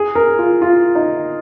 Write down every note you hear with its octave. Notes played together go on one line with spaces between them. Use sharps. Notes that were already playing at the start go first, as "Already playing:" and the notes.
Already playing: G#4
A#4
F4
F4
D#4